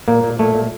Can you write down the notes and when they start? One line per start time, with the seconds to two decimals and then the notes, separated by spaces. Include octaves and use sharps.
0.08 A#2 A#3
0.23 A#2
0.39 A#2 A3
0.55 A#2